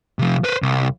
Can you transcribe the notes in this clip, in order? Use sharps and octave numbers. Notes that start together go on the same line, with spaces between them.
C3 F3
B4 C5
C2